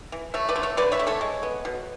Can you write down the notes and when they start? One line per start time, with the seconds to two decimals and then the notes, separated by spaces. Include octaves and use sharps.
0.12 E3
0.34 A3 C#5 E5
0.49 B4 D5
0.56 D3
0.63 C#5 E5
0.77 D3 B4 D5
0.92 C#5 E5
0.99 A3
1.07 A4 C#5
1.21 G#3
1.43 B3
1.65 B2